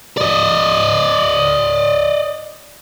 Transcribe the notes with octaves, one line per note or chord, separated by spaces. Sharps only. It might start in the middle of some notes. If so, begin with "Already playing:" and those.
D5 D#5